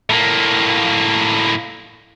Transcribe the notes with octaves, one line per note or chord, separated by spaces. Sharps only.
A2 A#3